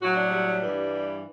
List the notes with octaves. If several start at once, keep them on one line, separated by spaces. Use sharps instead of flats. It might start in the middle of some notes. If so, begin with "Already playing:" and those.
A2 F#3 F#4
D4
G3
G3
G2 E3